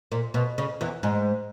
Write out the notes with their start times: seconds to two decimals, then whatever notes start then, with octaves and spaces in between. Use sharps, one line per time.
0.12 A#2
0.34 B2
0.58 C#3
0.81 E2 E3
1.03 G#2 G#3